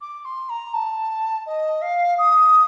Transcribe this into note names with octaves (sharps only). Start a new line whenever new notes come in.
D6
C6
A#5
A5
D#5
F5
D#6